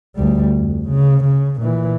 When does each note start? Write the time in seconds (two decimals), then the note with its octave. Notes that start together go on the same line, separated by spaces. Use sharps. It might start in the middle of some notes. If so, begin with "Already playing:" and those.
0.16 D2 G3
0.56 F2
0.89 C#3
1.24 C#3
1.61 A#2 E3